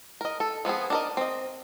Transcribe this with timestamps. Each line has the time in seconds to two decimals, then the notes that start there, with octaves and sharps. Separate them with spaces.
0.21 A#4 D#5
0.40 A4
0.65 F3 B3 C4 G#4
0.90 D4 A#4 D#5
1.17 C4 D#5